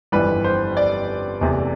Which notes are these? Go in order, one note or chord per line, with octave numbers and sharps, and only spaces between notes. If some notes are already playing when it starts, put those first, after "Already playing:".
G1 F2 E3 G3 B4
C5
D5
F1 E2 C3